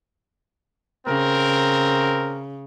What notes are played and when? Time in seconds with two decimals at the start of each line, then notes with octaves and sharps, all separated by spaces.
1.07 C#3 C4 A#4